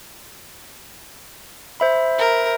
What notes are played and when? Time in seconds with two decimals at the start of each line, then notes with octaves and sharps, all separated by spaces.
1.80 C5 E5 B5
2.18 A#4